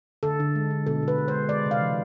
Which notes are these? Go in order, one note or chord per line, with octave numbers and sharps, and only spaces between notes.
D3 A4
D3
G#3
G#3
B2 A4
B2 B4
G#3
C5
G#3
G#3 D5
C3
F5
E3